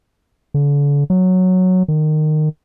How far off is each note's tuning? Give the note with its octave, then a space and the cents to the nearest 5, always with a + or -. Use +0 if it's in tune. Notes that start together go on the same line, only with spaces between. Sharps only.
D3 -40
F#3 -5
D#3 -20